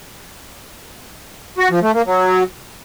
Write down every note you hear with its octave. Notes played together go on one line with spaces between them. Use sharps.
F#4
F3
A3
A#3
F#3